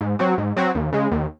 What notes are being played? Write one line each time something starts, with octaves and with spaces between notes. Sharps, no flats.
G#2
F#3 C4 F#4
G#2
F#3 C4 F#4
D#2
C#3 G#3
D#2